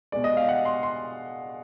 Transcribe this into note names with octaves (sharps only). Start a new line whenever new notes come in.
B2 G#3 D5
D#5
F5
F#5
C6
C6